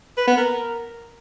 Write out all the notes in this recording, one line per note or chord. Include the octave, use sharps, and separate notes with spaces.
B4
B3
A#4